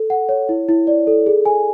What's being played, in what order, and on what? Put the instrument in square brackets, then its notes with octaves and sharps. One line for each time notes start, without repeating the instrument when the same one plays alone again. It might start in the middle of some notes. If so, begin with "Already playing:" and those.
Already playing: [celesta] A4
F#5
C#5
E4
E4
D5
A4
G#4
G#5